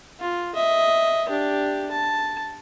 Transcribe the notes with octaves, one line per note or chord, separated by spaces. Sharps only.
F4
D#5 E5
D4 G4
A5